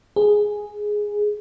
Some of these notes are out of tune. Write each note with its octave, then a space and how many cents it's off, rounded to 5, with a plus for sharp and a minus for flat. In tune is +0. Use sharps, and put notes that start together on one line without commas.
G#4 +0